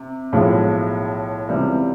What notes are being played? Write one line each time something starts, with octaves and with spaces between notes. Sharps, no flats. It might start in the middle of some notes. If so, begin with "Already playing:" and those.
Already playing: C3
B1 A2 F3 G#3
C#2 C3 E3 G3